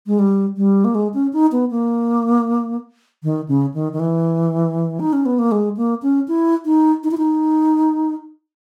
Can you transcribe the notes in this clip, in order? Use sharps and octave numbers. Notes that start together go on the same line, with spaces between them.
G#3
G3
G3
A#3
G#3
C#4
D#4
B3
A#3
D#3
C#3
D#3
D#3
E3
D#4
C#4
B3
A#3
G#3
A#3
C#4
E4
D#4
D#4
E4
D#4